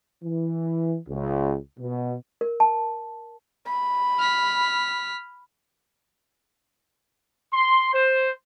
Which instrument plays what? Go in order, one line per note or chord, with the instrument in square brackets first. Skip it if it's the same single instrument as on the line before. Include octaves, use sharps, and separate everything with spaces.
[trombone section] E3
C#2
B2
[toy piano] A#4
A5
[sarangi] B5
[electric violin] F6 B6
[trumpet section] C6
C5